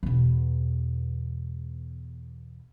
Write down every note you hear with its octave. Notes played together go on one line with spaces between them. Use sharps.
E2 B2